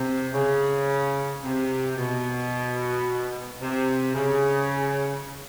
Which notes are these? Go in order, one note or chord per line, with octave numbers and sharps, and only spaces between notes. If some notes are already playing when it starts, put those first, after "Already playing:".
Already playing: C3
C#3
C3
B2
C3
C#3